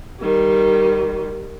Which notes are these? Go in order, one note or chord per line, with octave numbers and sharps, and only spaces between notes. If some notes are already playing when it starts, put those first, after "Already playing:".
D#3 G3